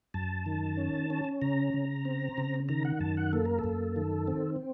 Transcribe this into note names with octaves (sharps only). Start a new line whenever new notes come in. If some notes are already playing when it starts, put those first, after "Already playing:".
F#2 A5
D#3
C#4
C#4
C#3 A#5
C#3
C4
C#3
D#3 A#5
F#5
F#2 A5
F#5
A#3 A4
A#4
A4
F#2
D#3
C4